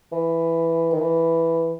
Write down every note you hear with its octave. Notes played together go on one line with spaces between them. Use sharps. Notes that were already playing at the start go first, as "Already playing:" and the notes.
E3
D#3
E3